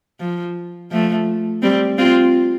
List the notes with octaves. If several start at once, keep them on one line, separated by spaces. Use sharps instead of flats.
F3
F3 A3
G3 C4
C4 F4